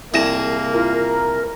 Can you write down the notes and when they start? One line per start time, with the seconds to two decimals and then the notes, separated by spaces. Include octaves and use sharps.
0.14 C2 A#3 E4 G#4 A5 A#6 E7
0.74 E4 F4 A#4